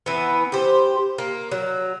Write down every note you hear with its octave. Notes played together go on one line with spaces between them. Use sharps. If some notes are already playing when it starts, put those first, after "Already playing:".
E3 B3
G4 C5
A#3
F#3